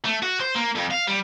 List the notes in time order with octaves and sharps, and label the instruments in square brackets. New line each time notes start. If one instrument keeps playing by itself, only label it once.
[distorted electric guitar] A3
F#4
C5
A#3
F2
F5
G3